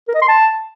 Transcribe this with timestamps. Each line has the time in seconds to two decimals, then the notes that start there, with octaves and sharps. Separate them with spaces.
0.08 A#4
0.15 D#5
0.22 C6
0.28 A5